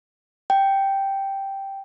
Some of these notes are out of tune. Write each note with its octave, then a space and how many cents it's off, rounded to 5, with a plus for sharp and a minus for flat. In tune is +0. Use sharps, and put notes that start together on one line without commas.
G5 -5